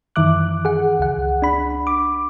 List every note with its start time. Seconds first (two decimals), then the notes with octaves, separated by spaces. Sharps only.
0.16 F#2 D#3 E3 E5 D6 F#6
0.65 G#4 F#5
1.00 C#2 F#5
1.42 D4 B5
1.87 D6